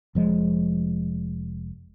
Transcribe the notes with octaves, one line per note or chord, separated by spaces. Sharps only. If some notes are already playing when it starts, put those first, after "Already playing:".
F1 F3 G#3